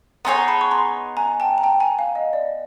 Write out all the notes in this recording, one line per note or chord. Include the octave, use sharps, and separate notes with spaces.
B3 D#4 G#4 C#5 A#5 C6
A#5
A5 B5
C#6
A#5 C6
G#5 A#5
G5 A5
A#5
G5 A5
G#5 A#5
F5
D#5
D5